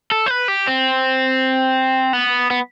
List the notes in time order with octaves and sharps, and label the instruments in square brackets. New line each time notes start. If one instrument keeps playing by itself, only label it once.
[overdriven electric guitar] A4
C5
B4
G4
C4
B3
B3